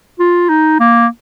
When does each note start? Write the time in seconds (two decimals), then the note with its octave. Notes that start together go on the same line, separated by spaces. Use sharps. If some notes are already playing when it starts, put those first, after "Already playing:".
0.19 F4
0.49 D#4
0.80 A#3